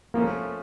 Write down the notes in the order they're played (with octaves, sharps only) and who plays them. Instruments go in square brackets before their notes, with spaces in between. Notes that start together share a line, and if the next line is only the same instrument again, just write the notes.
[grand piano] F3 A3 C#4 [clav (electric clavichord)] A#3